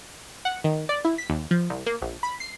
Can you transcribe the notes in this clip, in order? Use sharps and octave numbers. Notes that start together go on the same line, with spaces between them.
F#5
D#3
D5
E4
B6
D#2
F3
C2
A#3
A#1
B5
C7